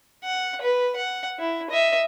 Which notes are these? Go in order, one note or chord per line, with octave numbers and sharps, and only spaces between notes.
F#5
B4
F#5
E4
D#5 E5